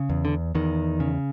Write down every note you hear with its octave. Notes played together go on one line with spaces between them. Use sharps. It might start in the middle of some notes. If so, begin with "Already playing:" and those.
Already playing: C#3
E2
D3
E2 D#3
C#3